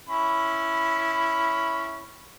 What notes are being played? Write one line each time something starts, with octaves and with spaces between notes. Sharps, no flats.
C#4 E4 B5